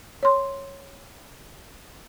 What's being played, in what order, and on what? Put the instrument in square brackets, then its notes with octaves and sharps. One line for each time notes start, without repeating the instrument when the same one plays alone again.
[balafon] C#5 C6